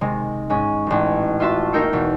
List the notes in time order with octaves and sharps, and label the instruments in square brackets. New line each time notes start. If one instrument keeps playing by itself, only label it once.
[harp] C3 D#3 G#3
G#2 G#3 C#4
D#1 A1
F4 F#4 E5 A5 C6
A#3 D#4 A#4 G5 E6 C#7
E2 B2